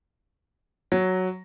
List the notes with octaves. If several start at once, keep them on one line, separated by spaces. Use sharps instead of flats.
F#3